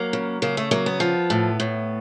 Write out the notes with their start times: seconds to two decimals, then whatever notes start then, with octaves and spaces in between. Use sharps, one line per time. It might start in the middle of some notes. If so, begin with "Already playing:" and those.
Already playing: F#3 A#3
0.13 C#3
0.42 C#3 A#3
0.57 A3
0.71 F#3 A#3
0.86 B3
1.00 F3
1.30 A2
1.60 A2